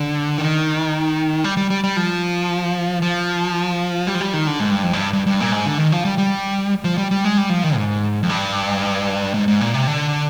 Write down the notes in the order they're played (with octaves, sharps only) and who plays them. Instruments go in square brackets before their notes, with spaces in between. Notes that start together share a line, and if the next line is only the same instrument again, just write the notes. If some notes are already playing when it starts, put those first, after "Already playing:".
Already playing: [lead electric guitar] D3
D#3
G3
G3
G3
G3
F3
F3
G3
F3
G3
D#3
D3
G#2
G2
F2
G2
G2
G2
A#2
G#2
D3
D#3
F3
G3
G3
F3
G3
G3
G#3
G3
F3
D#3
G#2
F2
G2
G#2
G#2
A#2
C3
D3